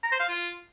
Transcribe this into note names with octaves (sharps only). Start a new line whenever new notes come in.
A#5
C5
F5
F4